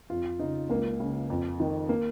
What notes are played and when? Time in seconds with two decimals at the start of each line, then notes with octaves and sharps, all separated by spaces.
0.10 F2 F4
0.39 C#3 D#4
0.70 C#2 A#3
1.00 C#3
1.30 F2
1.60 D#3
1.89 A#3